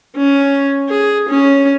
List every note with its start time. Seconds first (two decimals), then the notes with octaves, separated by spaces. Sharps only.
0.17 C#4
0.89 G#4
1.30 C#4